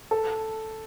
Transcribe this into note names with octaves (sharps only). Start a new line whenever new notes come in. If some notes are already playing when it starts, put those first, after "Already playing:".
A4